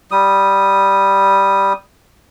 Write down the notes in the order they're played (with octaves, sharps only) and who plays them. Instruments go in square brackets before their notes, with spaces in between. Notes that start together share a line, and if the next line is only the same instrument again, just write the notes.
[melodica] G3 D#6